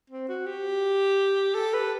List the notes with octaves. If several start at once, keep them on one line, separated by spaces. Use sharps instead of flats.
C4
F#4
G4
A4
B4